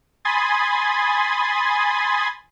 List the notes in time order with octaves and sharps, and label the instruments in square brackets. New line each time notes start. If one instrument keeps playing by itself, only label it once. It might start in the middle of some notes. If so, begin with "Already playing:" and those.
[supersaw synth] G#5 B5 C6 D#6 G#6 A6